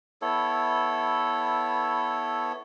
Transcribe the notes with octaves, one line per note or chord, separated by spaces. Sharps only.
B3 E4 A4 C#5